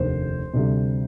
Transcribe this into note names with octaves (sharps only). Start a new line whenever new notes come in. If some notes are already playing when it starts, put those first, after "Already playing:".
Already playing: F1 D#2 D3 C5
D2 C3 G3